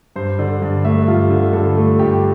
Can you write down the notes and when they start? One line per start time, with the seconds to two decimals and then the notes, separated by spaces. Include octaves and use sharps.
0.16 G2 C5
0.39 D3 D5
0.62 G2
0.85 A3 E5
1.08 G2 F4
1.30 D3
1.53 G2 A4
1.77 A3
1.99 G2 G4